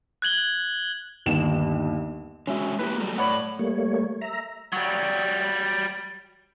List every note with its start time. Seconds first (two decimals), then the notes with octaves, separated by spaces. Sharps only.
0.22 F#6 G#6 F#7 G7
1.26 G1 D#2 E7
2.47 D3 G#3 C#4 F#4 E5
2.79 A#3 E4 G4 B4
3.00 F#3 G3 A3
3.18 A2 C#5 D5 F#5 B5
3.59 G3 A3 A#3 C#5
4.21 E5 A#5
4.73 F#3 G3